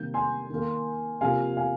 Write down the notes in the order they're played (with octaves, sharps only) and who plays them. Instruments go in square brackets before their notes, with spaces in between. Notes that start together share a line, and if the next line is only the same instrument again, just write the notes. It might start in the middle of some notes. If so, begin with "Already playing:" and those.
Already playing: [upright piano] C3 D#3 G3 A#3 G6
G#5 C6
D#3 A#3
C3 F3 A#3 F5 G#5
F5 G#5